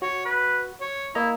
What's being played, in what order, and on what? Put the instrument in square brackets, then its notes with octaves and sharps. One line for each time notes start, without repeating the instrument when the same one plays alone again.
[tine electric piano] F#4 [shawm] C#5
[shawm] B4
C#5
[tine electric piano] A#3 D#5 A#5 [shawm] E4